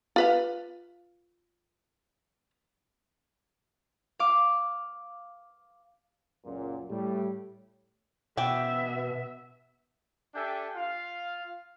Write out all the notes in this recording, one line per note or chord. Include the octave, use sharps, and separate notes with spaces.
F4 B4 F5
F5 D6
C#2 F#2 A#2
A2 G3
B2 E3 B3 E5 G5
D4 G4 A4 E5 G5 G#5
F4 F5